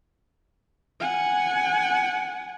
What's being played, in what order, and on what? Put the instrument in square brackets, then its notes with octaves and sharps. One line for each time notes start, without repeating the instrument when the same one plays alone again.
[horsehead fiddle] F#5 G#5